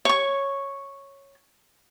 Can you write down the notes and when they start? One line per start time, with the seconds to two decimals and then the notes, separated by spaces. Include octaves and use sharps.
0.05 C#5 C#6